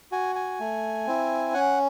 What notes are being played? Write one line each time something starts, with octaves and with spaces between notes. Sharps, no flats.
F#4 G#5
G#5
A3
C4 E4
C#4 F#5